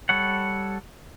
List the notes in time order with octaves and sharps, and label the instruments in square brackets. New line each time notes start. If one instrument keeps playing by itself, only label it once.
[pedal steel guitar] G3 A4 C#5 F#5